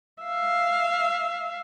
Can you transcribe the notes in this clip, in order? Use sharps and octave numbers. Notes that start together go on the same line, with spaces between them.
E5 F5